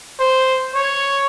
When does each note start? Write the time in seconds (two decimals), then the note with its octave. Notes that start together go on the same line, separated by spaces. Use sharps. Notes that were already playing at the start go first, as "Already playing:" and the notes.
0.19 C5
0.74 C#5